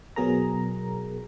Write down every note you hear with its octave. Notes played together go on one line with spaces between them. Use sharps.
B2 F#3 B3 G#4 A#4 A#5